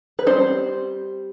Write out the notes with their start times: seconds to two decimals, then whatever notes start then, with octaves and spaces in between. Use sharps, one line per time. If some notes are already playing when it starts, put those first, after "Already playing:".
0.19 B4
0.27 G3 C4 D#4 C5